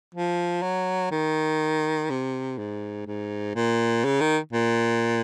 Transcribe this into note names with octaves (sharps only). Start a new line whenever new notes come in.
F3
F#3
D#3
C3
G#2
G#2
A#2
C#3
D#3
A#2